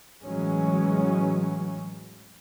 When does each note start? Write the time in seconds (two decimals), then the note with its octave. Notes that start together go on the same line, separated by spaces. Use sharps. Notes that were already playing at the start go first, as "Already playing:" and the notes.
0.24 A2 E3 F#3 G#3 C#4